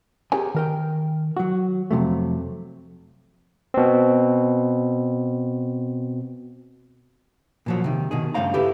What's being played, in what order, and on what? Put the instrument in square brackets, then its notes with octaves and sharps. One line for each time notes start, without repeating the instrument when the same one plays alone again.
[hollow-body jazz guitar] G4 G#4 A#4 C#5 G#5
D#3 A#4 G5
F#3 F#4
F2 C3 F#3 A3
[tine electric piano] B2 C4
[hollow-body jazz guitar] A#2 F3 F#3
C3 D#3
B2 D#3 G#4
G2 C#3 A3 C5 F5 A#5
E4 G4 A4 B4